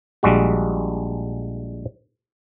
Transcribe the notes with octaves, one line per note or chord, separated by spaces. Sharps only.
A#1 G3 G#3 F#4